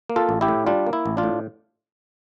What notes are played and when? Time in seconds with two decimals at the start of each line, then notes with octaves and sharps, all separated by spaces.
0.10 A#3
0.16 F4 A4
0.29 A1
0.41 E4 G4
0.48 A2
0.66 G3 D4 F4
0.87 A#3
0.93 E4
1.06 A1
1.17 D4 F4
1.23 A2